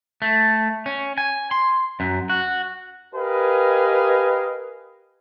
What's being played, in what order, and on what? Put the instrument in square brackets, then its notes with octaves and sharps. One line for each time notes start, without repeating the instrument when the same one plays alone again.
[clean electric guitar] A3
C#4
G#5
C6
F#2
F#4
[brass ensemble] G4 A#4 B4 D#5 F5 G#5